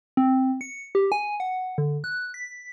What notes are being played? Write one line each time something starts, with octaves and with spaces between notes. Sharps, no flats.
C4
C#7
G4
G#5
F#5
D3
F#6
B6